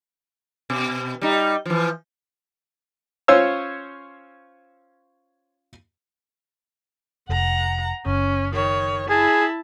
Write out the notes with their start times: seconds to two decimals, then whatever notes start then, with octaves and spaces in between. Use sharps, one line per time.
0.70 B2
1.21 G3 D#4
1.66 E3 F3
3.28 C#4 F4 C5 C#5 E6
7.29 F1 F#5 A#5
8.06 F#1 C#4
8.53 D#3 C#5
9.10 E4 G#4 A5